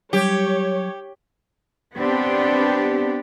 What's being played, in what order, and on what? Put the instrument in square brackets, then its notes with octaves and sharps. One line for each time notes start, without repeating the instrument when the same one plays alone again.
[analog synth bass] F#3 [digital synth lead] G3 [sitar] G4 [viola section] C#5
[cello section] B3 C4 D4 G4